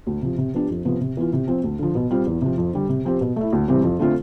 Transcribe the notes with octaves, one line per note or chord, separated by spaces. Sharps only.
D2
C3 F3
C3
F3 B3 D4 G4
F2
C3 F3 B3
C3
E3 B3 F4
C3
F3 C4
D2
D3 F3
B2
G3 C4 F4
E2
C3 F3
F2
D3 G3
C3
F3 C4 G4
B2
A3 E4
D2
C3 E3 G3 C4
F2
D3 A3 C4 F4